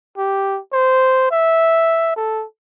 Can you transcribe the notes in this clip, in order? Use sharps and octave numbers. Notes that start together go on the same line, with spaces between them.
G4
C5
E5
A4